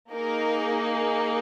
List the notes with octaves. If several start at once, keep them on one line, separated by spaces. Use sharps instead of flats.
A#3 D#4 G#4 A#4